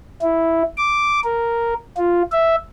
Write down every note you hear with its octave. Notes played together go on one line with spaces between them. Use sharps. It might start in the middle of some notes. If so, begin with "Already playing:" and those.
E4
D6
A#4
F4
E5